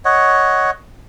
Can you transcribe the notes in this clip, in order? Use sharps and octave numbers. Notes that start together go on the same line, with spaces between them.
C#5 D#5 F#5